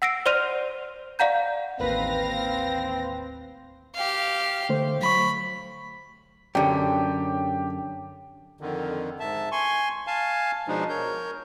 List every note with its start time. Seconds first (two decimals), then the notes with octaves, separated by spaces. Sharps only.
0.02 F#5 E6 A#6 C7 D7
0.26 C5 D5 C6 F6 D#7 F7
1.19 D5 F5 F#5 A#5 G6
1.79 A1 D#2 C4 B4 F5 A#6
3.96 G4 F5
4.69 D3 A3 C5
5.02 F#3 B5 C#6
6.55 F#2 D3 G4
8.61 F2 D3 D#3
9.20 G#2 E5 A5
9.52 G#5 C6 C#6
10.07 F5 G#5 A5
10.68 B2 F3 G#3 D4 D#4
10.89 A#4 C#5 G6